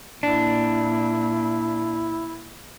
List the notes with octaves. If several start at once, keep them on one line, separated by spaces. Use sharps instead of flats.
A#2 D4 E4